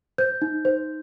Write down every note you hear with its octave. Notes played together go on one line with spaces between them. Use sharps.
C5 G6
D#4
C5